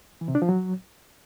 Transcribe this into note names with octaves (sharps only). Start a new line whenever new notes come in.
E3
C3
D4
F3
F#3